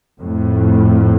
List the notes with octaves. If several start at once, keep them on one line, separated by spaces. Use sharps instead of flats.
F2 A2